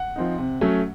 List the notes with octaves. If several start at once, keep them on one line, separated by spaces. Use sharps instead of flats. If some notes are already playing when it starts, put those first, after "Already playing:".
Already playing: F#5
F3 C4 D#4
C3
F#3 A3 C#4